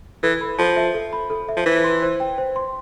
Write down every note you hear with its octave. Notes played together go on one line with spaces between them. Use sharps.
E3 A4
B5
F3 A4
E5
A4
B5
A4
E5
F3
E3 C5
C6
C5
G5
C5
C6